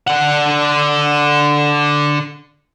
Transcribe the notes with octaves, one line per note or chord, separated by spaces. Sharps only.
D3 F#5